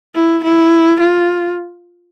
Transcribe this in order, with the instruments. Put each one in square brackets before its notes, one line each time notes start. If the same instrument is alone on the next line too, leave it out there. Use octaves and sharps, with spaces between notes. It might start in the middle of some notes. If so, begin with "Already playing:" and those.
[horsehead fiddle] E4
E4
F4